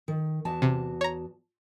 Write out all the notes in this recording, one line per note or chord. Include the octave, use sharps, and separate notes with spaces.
D#3
E2 F#4 A5
C3
C#5 A#5